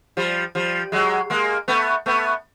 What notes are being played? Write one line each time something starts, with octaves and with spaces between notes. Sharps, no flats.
F3 G3
F3 G3
F#3 G#3
G#3 A#3
A3 B3
A3 B3